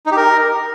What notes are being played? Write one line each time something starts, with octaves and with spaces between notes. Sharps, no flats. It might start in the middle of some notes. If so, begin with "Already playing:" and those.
D#4
G4
A#4